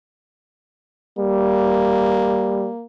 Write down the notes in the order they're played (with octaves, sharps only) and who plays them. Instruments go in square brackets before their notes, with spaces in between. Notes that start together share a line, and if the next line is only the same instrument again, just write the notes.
[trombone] G3 [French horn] A#3